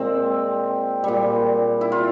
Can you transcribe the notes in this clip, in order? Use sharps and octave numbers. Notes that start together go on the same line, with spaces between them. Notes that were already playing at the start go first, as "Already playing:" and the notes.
Already playing: A#2 G#3 C4
A#2 G3
E4
F4